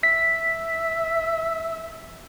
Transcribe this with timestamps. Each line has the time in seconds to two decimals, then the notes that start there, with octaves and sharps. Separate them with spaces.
0.03 E5 B6